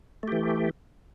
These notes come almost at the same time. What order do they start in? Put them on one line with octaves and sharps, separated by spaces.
A3 G4 E3